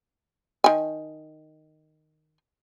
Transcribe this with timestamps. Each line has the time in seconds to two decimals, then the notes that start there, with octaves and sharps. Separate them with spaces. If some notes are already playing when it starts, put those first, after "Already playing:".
0.64 D#3 G#5